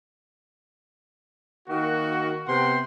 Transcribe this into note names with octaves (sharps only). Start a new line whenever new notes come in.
D#3 A#3 F#4
C3 B3 F#5 G5 C6